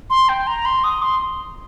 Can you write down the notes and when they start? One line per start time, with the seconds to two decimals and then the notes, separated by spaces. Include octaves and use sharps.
0.10 C6
0.29 G5
0.47 A#5
0.65 C6
0.84 D#6
1.02 C6